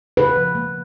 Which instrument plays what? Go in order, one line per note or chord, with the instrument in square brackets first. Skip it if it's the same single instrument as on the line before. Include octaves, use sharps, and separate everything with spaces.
[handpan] C#3 B4
F3
A#3